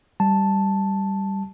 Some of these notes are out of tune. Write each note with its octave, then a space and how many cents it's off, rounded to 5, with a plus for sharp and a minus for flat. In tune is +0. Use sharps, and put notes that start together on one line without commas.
G3 +0 A5 +0